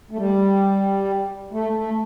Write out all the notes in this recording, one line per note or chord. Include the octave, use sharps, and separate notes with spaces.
A3
G3
A3
A3